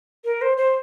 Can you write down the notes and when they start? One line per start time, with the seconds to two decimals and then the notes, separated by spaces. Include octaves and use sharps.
0.25 A#4
0.42 C5
0.57 C5